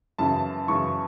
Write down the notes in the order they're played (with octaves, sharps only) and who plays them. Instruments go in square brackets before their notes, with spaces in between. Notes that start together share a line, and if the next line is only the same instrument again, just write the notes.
[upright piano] F#2 C#3 E3 A5
F#2 C#3 E3 C#6